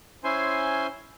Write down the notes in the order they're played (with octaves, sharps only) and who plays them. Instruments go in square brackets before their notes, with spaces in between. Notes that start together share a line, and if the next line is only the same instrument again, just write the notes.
[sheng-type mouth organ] C#4 E4 C5 G#5 C6